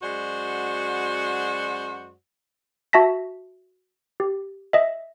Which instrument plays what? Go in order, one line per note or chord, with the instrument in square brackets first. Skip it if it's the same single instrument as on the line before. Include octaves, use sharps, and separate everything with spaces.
[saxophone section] F#2 G#3 F#4 C5 D5 F#5
[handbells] F#4 E5 A5 A#6 B6
G4
D#5 E5